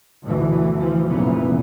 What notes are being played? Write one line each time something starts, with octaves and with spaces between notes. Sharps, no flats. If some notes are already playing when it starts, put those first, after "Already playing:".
D2 B2 E3
E3 F3
F1 A#2 C#3 E3 B3